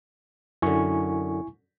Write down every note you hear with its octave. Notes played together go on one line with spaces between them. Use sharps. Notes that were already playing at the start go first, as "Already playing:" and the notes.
F#2 D3 E4 G#5 C#6